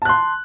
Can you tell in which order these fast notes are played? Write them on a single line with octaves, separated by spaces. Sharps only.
A5 F#6 C6